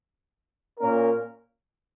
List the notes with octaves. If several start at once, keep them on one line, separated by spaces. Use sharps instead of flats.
A#2 A#3 C#4 A#4